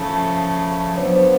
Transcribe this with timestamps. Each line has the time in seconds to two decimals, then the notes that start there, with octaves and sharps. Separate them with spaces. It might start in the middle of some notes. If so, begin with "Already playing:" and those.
Already playing: C#3 F3 A3
0.97 C#5
1.01 F#3 B3 D4 F4 C5